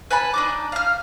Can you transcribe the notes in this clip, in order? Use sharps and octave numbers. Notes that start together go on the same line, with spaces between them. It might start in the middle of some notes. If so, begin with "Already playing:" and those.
B4 G#5 A5 B5
D4 D#4 D6
F5 F6